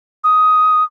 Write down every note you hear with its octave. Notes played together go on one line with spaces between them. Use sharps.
D#6